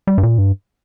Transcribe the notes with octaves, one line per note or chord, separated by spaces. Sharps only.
G3
G2
A#2
G2